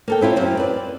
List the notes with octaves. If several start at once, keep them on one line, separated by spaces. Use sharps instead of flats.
A#3 A4 G5
C4 E4 F4 C#5
F#2 C4
B4 D5